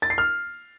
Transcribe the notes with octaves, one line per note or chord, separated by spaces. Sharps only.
A6
C7
F6